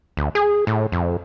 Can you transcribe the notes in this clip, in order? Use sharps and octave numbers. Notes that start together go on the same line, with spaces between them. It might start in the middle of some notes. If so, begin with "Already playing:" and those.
D2
G#4
A2
F2